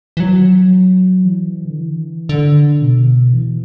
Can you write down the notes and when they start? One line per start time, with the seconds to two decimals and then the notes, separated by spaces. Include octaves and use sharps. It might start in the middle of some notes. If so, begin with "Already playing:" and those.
0.17 E3
0.20 F#3
1.25 E3
1.65 D3
1.77 E3
2.29 D3
2.82 B2
3.33 E3